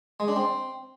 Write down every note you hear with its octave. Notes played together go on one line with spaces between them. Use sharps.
G#3
D4
C4